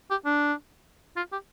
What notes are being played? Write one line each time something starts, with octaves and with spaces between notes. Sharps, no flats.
G4
D4
F4
G4